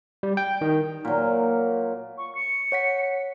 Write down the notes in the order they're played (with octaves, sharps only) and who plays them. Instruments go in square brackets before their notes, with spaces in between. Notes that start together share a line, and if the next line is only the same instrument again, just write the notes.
[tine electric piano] G3
G5
D#3
[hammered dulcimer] A#2 F#3
[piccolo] C#6
C#7
[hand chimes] C#5 F#5 B6